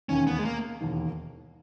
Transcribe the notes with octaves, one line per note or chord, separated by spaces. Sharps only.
E1 D#2 D#3 C#4
B3
G#3
A#3
E1 D#2 D#3